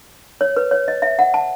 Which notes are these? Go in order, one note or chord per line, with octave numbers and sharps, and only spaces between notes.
C#5
B4
C#5
D#5
E5
F#5
A5